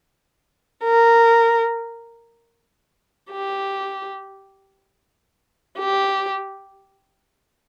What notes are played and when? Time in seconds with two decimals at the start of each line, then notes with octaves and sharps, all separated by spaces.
0.84 A#4
3.32 G4
5.79 G4